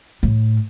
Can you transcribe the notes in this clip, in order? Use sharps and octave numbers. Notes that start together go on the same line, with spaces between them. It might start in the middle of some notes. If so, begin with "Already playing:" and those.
A2